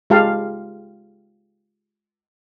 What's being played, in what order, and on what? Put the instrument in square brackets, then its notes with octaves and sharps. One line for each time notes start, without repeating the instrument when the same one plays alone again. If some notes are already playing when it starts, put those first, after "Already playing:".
[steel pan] G#3 F4 G4 F5 A5